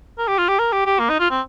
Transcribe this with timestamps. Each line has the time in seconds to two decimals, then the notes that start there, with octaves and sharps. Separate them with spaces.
0.18 A#4
0.28 G4
0.38 F4
0.48 G4
0.59 A#4
0.73 G4
0.86 G4
0.99 A#3
1.10 D#4
1.20 F4
1.31 C4